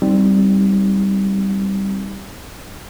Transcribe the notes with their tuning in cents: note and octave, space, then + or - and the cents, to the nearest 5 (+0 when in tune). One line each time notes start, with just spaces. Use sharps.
G3 +0 C4 +0 D#4 +10